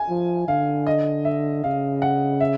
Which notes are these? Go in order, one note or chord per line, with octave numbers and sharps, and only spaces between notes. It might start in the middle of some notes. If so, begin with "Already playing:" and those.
Already playing: G#5
F3
D3 F5
D#5
E5
C#3 F5
F#5
E5